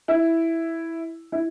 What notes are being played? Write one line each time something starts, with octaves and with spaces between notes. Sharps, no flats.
E4
E4